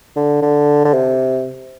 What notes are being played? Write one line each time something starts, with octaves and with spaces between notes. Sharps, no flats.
D3
D3
D3
C3